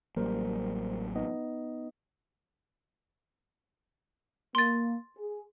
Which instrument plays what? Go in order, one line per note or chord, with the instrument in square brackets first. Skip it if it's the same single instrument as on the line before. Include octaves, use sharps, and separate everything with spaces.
[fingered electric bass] A1 F#3 A#3 [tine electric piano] G3 A#4 C5
[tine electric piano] B3 D#4 D#5
[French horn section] A#3 [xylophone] C6 A6
[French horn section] G#4